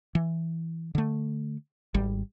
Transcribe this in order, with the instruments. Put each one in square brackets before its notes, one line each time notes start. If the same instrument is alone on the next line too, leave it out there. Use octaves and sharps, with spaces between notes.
[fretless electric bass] E3
D3 A3
G#1 G3